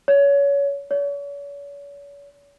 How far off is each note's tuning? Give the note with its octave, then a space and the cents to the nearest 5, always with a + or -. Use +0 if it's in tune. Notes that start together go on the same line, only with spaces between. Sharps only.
C#5 +25
C#5 +40